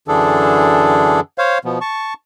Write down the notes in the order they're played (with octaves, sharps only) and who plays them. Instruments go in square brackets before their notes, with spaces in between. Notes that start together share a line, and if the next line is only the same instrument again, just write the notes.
[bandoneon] F#2 D3 E3 D4 G#4 A4
C5 C#5 F5
B2 F3 B3
A5 C#6